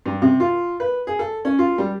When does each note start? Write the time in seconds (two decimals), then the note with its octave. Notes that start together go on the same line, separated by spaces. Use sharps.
0.06 G2
0.22 C3
0.40 F4
0.80 B4
1.07 G#4
1.19 A4
1.45 C#4
1.59 F4
1.78 G3